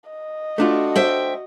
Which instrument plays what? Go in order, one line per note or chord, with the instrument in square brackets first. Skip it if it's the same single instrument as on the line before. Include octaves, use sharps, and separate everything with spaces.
[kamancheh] D#5
[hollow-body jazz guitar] A3 D4 F4 [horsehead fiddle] F#4
[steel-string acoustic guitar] C5 E5 G5